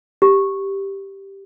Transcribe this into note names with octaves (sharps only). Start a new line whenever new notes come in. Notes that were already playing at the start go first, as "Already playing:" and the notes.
G4